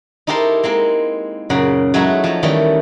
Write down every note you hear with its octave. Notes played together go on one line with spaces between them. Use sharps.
D#4 E4 G4 A4 A#4 C5
G#3 A#3 C4
F#2 A#2 C#3 F#3 F#5
F#3 G#3 A3 D#4 E4 F#4
F3 F#3
D#3 E3 G3 A3 C#4